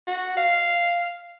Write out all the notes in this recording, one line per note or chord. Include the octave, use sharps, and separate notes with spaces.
F#4
F5